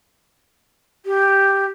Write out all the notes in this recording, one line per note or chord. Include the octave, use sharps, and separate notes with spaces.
G4